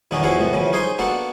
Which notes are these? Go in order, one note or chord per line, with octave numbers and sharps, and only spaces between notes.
E2 A#2 D#3 B3 C#4 D4
E2 F3 E4 F#4 G#4 F5
A2 C3 B3
F#2 C#3 E3 F3
C#4 D#4 G#4 C5 G#5 C6
A#3 B3 D4 F#4 A4